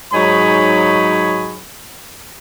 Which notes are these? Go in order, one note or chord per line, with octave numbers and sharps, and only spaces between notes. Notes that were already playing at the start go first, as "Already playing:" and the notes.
G#2 F#3 D#4 G#4 C#5 B5